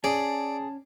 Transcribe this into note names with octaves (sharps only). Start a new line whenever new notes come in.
C#4 G#4 D5 A5